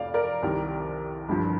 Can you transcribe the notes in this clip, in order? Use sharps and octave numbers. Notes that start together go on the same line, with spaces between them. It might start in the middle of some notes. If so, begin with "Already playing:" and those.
Already playing: F1 F2 D5 F5
A#4 D5
C2 C3 D#3
G1 G2 F3